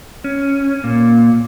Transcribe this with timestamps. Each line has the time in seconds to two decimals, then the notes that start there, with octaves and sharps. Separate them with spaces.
0.24 C#4
0.84 A#2